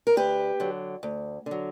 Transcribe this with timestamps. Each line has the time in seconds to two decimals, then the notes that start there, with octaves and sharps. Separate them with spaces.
0.07 A#4
0.16 D2 G4 B4
0.60 D3 F#3
1.03 D2
1.46 D3 F#3